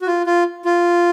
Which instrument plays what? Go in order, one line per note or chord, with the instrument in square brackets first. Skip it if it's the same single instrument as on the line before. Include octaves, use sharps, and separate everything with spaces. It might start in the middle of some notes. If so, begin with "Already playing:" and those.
[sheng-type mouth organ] F#4
F4
F4
F4